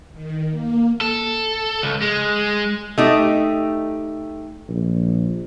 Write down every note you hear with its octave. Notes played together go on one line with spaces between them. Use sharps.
D#3
A#3
A4
C#2
G#3
A3 D#4 G4
A#1